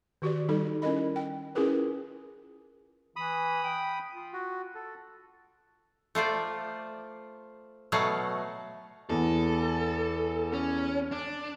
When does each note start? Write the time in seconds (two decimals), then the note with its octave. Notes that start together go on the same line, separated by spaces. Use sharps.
0.22 D#3 F#4 G4 D5
0.49 G3 D#4 A4
0.82 C#4 E4 A#4 D#5 B5
1.16 G5
1.55 C#4 E4 F4 G#4 A#4 B4
3.16 E3 B5 D#6
3.64 G5
4.13 F4
4.33 F#4
4.75 A4
6.15 A3 F4 C5 D5
7.92 B2 F#3 A3 F5 F#5
9.10 E2 A4
10.53 C#4
11.12 D4